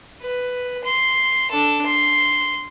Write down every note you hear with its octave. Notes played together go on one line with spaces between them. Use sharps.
B4
C6
D4 A4
C6